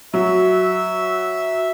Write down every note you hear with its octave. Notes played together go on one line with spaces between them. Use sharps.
F#3 E5